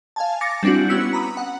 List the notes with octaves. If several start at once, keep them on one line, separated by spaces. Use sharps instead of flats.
F5 G#5 A5
D6 A6 A#6 C#7
G3 C4 D4 E4 F#4
B3 C#4 F#4 E6 B6 C#7
A#5 B5 D#6
F#5